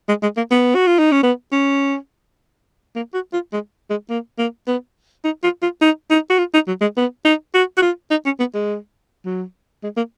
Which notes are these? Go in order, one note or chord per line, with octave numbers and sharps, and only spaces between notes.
G#3
G#3
A#3
B3
F#4
F4
D#4
C#4
B3
C#4
A#3
F#4
F4
G#3
G#3
A#3
A#3
B3
D#4
F4
F4
D#4
D#4
F#4
F4
D#4
F#3
G#3
B3
D#4
F#4
F#4
F4
D#4
C#4
B3
G#3
F#3
G#3
A#3